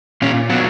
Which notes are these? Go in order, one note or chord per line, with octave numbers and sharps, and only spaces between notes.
A#2 C#4
F#3 B3